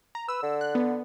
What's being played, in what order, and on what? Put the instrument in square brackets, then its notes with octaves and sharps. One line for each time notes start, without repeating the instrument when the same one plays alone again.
[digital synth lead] A#5
[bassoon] B4 [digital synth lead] E6
[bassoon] D3
[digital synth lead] F#6
B3